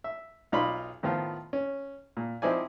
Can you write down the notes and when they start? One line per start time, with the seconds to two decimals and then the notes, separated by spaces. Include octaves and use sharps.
0.04 E5
0.52 B1 D#4 F4 D5 B5 C6
1.03 A2 D#3 F3 B3 F4
1.53 C#4
2.17 A#2
2.42 F3 C4 D#4 E4 D5 G#5